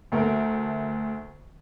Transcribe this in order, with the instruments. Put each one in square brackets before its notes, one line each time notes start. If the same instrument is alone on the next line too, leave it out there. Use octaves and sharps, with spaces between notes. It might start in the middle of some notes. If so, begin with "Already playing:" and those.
[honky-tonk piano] D2 A3 A#4